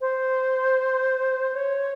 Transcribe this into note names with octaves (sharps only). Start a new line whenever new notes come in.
C5
C#5